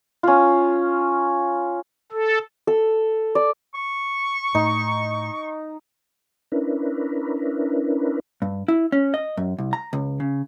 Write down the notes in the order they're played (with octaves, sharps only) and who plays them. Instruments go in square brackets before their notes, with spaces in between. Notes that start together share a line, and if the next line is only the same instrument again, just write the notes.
[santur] C#4 F4
[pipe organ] A4
[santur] A4
D5
[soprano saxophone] C#6
[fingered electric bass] A2 [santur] D#4
[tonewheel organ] C#4 D4 E4 A#4 B4
[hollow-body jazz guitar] G2
E4
C#4
D#5
F#2
C2
A#5
C#2
C#3